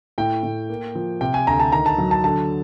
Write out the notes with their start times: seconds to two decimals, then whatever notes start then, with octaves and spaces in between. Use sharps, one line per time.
0.18 A2 G5
0.43 A2
0.69 A#3
0.95 F3
1.21 C3 G5
1.34 G#5
1.47 D2 A#5
1.60 A5
1.72 D#3 A#5
1.86 A5
1.98 F#3
2.11 A5
2.24 D3 A5